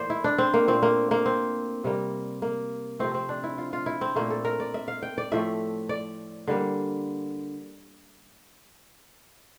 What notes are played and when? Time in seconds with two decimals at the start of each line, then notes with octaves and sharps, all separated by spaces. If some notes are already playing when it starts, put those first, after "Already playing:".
Already playing: A2 E3 A#3 C5 D5
0.10 E4
0.24 D4
0.38 C4
0.54 A#3
0.68 A#2 A3 C4
0.82 A#3
1.11 A#3
1.26 C4
1.84 C3 G3 A#3
2.42 A#3
2.99 C3 F3 A3 C4
3.14 C4
3.29 D4
3.44 E4
3.58 F4
3.73 F4
3.86 E4
4.01 C4
4.16 A#2 A3 A#3
4.30 A4
4.45 A#4
4.60 D5
4.74 E5
4.88 F5
5.03 G5
5.18 D5
5.32 A2 F3 A3 E5
5.89 D5
6.47 D3 G3 A#3